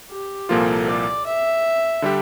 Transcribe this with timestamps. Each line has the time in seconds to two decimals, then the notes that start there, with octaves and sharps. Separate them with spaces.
0.11 G4
0.49 C2 A#2 F3 A#3 F4 A4
0.88 D5
1.26 E5
2.02 D3 G3 D4 G4